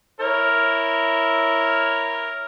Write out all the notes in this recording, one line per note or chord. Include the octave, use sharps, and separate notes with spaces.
E4 A#4 C#5